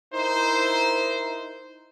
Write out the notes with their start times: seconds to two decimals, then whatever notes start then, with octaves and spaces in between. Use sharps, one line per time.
0.12 D#4 E4 A#4 C5